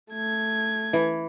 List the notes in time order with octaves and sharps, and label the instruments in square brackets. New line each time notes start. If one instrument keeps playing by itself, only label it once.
[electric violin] A3 G#6
[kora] E3